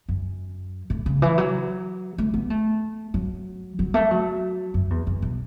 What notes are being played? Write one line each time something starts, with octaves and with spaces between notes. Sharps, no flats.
F#2
A2
C#3
E3
F#3
A3
B3
A3
F#3
F#3
A3
F#3
F#2
E2
F#2
B2